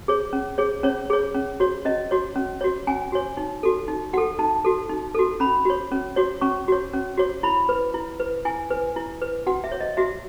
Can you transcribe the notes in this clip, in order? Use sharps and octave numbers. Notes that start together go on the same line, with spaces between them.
G#4 C#5
C#4
G#4 C#5
C#4 C#5
G#4 C#5
C#4
F#4 C#5
C#4 D#5
F#4 C#5
C#4
F#4 C#5
C#4 G#5
F#4 C#5
D#4
F#4 A4
D#4
F#4 A4 F#5
D#4 A5
F#4 A4
D#4
F#4 A4
C#4 B5
F#4 C#5
C#4
F#4 C#5
C#4 C#6
F#4 C#5
C#4
F#4 C#5
E4 B5
B4
E4
B4
E4 G#5
B4
E4
B4
F#4 F#5
E5
C#5
D#5
F#4 E5